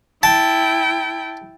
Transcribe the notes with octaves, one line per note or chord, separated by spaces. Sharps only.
E4 G5 A5